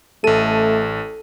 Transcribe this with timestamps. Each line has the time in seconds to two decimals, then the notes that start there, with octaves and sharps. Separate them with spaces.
0.24 A1 A3 A4 D#7